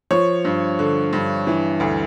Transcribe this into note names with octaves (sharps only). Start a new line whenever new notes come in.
F3 C#5
G2
D3
G2
E3
D2